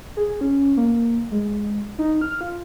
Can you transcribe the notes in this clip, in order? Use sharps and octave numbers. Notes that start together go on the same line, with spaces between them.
G#4
C#4
A#3
G#3
D#4
F6
F4